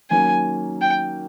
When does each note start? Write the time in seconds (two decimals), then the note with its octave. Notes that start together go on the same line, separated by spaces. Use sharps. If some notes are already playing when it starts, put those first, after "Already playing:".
0.10 D#3 F#3 A#3 C#4 G#5
0.81 G5